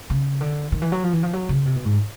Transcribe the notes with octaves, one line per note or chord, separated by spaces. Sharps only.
C#3
D3
D#3
E3
F#3
F3
E3
F3
F#3
C#3
C3
B2
G#2